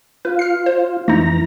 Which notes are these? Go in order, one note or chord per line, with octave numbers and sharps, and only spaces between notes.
F4 B4
F6 C7
C5
F2 E3 A3 D#4 A#5